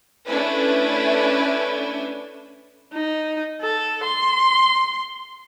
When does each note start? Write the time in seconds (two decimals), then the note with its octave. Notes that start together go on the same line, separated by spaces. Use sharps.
0.28 A3 C#4 D4 E4 B4
2.94 D#4
3.62 A4
4.04 C6